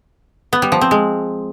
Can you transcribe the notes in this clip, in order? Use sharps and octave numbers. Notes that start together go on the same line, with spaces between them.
B3
G3
F3
C4
G#3